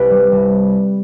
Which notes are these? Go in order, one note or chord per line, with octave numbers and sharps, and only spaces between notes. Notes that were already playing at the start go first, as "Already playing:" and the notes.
Already playing: C2 G4 B4
G3
C2